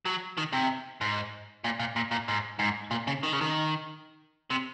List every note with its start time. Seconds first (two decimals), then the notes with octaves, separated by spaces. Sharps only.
0.05 F#3
0.37 D#3
0.53 C3
1.01 G#2
1.64 A#2
1.79 A#2
1.96 A#2
2.11 A#2
2.28 G#2
2.59 G#2
2.91 A#2
3.07 C#3
3.23 D#3
3.33 C#3
3.41 D#3
4.50 C3